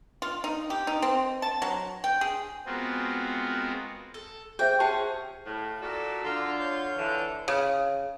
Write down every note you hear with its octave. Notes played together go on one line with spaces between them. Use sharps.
F4
D#4
G4
D#4
C4
A5
F#3
G5
G#4
G#3 B3 C4 F4 F#4 A#4
A4
G#4 C5 E5 G5
C#4 G4 G#4 F#5 A5
A2 F5
A#2 F#4 A4 D5
D3 F4 D5 A#5 E6
C#5 G6
D3 E3
C#3